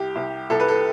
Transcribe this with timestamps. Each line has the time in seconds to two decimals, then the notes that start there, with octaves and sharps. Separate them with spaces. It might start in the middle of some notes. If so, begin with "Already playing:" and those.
Already playing: C2 G4
0.16 C2
0.50 C2 A4
0.60 B4
0.68 A4